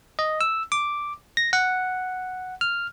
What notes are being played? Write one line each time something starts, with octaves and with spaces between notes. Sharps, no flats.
D#5
E6
D6
A#6
F#5
F6